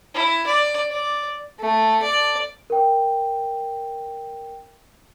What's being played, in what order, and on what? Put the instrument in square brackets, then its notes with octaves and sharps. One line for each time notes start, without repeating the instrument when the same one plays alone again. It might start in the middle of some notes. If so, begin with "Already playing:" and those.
[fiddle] E4
D5
D5
[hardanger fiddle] A3
D5
[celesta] A#4 G5